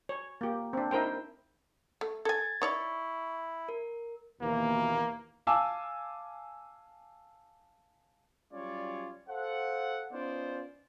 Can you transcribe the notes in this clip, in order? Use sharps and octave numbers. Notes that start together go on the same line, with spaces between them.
C#5
A#3 G4
C4 D4
D#4 E4 A#4 C5 G5
A3
A4 G#5 G#6 A6
D#4 E4 C#5 D5 C#6
A#4
D#2 B2 E3 A#3
F5 G#5 A5 D6 E6
F#3 G3 C#4 F4 C#5 D5
A4 C5 F5 F#5
B3 C#4 D#4 F4 C5 D5